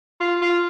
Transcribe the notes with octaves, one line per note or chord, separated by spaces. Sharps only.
F4
F4